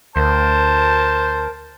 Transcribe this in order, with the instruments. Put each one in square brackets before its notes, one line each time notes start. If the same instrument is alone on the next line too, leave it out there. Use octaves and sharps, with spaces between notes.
[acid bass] D2 [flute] A#4 [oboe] C5 [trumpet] A5